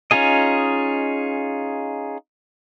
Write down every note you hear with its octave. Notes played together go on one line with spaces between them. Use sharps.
C#4 D#4 F4 G#4 D#5